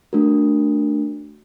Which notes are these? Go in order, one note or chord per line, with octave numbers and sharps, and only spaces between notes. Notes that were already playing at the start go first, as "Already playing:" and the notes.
A3 D4 F#4 A#4